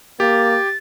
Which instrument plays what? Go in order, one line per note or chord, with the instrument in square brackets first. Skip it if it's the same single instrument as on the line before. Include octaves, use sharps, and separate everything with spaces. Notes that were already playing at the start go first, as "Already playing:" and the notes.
[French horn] A#3 [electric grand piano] G4 [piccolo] A6